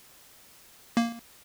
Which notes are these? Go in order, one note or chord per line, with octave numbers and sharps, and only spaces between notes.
A#3